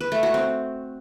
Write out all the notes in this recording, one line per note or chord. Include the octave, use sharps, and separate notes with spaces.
B4
A3
F#4
C4